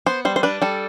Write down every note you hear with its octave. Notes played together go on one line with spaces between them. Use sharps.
B3 C5
G3 C5
C5
D4 B4
G3 A4